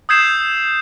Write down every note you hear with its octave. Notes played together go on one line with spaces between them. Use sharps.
D#6 E6 G6 G#6 C7 E7